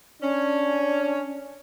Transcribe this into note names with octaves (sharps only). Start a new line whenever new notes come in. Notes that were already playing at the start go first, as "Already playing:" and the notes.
C#4 D4